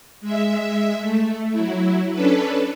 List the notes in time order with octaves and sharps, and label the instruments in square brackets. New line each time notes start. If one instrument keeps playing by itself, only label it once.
[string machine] G#3 E5
A3
F#3 E4
C#4 D4 A4 B4